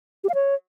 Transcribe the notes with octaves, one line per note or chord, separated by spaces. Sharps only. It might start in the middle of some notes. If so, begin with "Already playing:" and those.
G4
F5
C#5